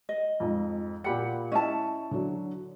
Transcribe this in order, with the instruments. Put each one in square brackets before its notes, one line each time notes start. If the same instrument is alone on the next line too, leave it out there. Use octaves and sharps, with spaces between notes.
[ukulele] D#5
[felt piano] F2 G#2
[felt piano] A#2 G4 C#7 [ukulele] F#5 B5
[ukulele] C#4 E4 A5 [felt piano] D#5
[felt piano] D3 F#3